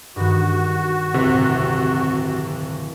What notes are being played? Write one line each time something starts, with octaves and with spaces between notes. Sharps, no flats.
G2 D#3 F#4
D1 C3